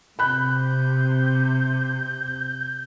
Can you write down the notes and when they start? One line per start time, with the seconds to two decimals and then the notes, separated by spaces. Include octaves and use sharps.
0.19 C3 B5 F#6 G6